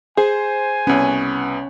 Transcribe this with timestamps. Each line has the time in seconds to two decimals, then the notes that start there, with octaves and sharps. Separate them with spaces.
0.17 G#4 C5 G#5
0.87 C2 B3 C#4